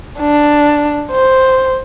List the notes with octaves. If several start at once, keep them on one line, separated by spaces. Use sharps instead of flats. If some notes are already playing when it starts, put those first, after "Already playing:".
D4
C5